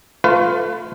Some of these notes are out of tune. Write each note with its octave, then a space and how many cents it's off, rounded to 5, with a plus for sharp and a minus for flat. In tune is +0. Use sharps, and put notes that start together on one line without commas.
A3 +15 F4 +10 B4 +35